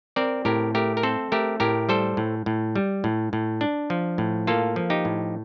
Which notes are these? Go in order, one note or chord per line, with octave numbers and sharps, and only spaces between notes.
C4 A#4 D5
A2 G4 A#4
A3 G4 A#4
A#4
C4 A4 C5
A3 G4 A#4
A2 G4 A#4
G3 A4 C5
A2
A2
G3
A2
A2
D4
F3
A2
A#3 F4 A4
F3
D#4 G4
A2